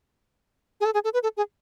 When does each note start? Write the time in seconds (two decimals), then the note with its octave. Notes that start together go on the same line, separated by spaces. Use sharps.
0.81 G#4
0.85 A4
0.94 G#4
1.04 A4
1.14 B4
1.23 A4
1.37 G#4